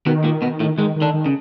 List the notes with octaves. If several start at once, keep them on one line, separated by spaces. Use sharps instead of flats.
B2 D#3 B3
A#2 A#3
B2 B3
A2 A3
G#2 D#3 G#3
D#3
D3 D4
D#3
C#3